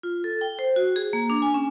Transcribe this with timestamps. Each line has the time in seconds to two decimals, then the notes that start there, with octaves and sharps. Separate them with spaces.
0.03 F4
0.24 A4
0.41 G5
0.59 C5
0.76 F#4
0.96 G#4
1.13 A#3
1.30 D4
1.42 G#5
1.54 C#4